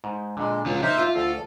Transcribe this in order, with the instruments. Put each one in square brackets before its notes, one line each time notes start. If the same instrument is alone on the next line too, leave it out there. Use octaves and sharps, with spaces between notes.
[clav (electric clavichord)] G#2
[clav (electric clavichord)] A#2 D3 [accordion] G#3
[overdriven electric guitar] C#3 F4 [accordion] F#3
[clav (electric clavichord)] A#3 D#5 [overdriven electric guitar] D#4 [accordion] C5 E5
[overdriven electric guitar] F4
[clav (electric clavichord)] D2 [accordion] A4